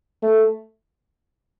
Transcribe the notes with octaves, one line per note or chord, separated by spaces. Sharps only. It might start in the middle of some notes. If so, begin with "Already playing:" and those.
A3